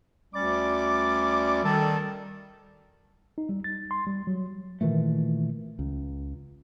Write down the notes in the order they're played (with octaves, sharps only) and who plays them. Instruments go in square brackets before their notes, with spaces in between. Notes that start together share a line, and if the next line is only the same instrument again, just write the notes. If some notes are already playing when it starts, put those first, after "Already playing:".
[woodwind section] D2 G3 C#4 D5 D6
D#3 G3 A4
[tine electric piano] D#4
G3
A6
C6
G3
F#3
[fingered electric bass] A#2 D#3 E3 A3
C#2